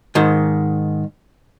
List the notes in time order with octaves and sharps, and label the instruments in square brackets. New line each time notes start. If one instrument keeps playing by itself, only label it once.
[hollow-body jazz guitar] G#2 D#3